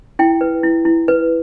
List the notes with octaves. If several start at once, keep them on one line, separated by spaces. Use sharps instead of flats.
E4 G5
B4
E4
E4
B4